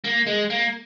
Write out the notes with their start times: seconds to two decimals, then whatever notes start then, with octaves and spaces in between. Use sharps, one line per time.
0.04 A#3
0.27 G#3
0.50 A#3